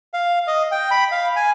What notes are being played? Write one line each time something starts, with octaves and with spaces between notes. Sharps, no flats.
F5
D#5
G5
B5
F5
G#5